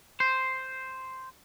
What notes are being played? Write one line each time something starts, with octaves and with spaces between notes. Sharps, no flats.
C5